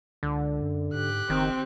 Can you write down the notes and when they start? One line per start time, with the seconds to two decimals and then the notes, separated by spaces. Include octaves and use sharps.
0.23 C#2 D3
0.62 F#2
0.94 G#2 G4 F#6
1.30 F#1 D#3 C4